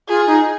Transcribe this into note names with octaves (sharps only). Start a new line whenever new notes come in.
F4 G#4
D#4